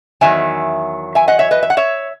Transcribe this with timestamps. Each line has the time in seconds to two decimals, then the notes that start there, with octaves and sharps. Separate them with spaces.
0.21 E2 D#3 F#3 E5 G#5
1.15 E5 G#5
1.28 D#5 F#5
1.39 C#5 E5
1.51 B4 D#5
1.63 E5
1.70 F#5
1.77 C#5 E5